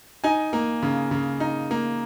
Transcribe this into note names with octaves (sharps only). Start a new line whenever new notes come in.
D#4 G#5
A#3
C#3
C#3
D#4
A#3